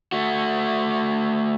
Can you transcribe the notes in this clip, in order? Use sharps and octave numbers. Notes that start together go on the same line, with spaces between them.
A3 F#4